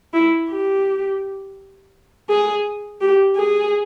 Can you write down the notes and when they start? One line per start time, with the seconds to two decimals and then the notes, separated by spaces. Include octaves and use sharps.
0.14 E4
0.50 G4
2.29 G#4
3.01 G4
3.36 G#4